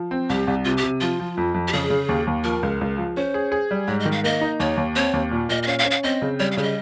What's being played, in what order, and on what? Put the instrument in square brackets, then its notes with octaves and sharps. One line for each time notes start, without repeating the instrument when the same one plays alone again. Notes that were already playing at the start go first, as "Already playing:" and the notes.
Already playing: [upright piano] F3
C4
[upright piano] C2 [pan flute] G4
[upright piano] C2
[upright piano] C3 [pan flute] F4
[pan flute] G4
[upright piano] C3
[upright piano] F3 [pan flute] F4
[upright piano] F3
F2
F2
[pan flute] G4
[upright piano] C#3 [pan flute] G#4
[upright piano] C#3
D#2
D#2
[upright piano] F3 [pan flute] A#4
[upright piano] C#2
C#2
F3
[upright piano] C#4 [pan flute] C5
[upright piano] G#4
G#4
G3
[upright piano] G#2 [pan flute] C#5
[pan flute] D#5
[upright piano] D#3
[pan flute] F5
[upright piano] A#3 [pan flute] D#5
[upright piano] D#4
[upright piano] D#2 [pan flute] C#5
[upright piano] D#2
[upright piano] C4 [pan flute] C#5
[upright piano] D#2
A#2
[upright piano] A#2 [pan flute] D#5
[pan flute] D#5
[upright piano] C#4 [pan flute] F5
[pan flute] F5
[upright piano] C#4
[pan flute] F5
[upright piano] C4 [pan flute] D#5
[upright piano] C#3
[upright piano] G3 [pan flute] C#5
[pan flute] F5
[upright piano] C#3 [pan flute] C#5
[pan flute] D#5